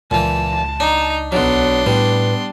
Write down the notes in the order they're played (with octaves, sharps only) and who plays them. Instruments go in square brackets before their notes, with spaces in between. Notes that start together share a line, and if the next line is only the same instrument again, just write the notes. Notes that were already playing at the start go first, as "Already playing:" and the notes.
[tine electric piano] C#2 [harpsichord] A#2 E3 [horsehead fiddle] A5
[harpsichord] D4 [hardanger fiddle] D#4 A#5
[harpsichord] B1 F#3 [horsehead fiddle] B3 [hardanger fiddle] D4 C6
[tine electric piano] A2 B4 [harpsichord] G3 [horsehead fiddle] B3